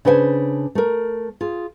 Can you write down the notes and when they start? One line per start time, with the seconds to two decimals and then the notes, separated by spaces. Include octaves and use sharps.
0.05 C#3 D4 B4 C5 G5 G#5
0.75 A3 A#4
1.41 F4 G#4